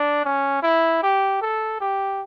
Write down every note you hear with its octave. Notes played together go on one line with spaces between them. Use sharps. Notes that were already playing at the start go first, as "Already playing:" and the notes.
Already playing: D4
C#4
E4
G4
A4
G4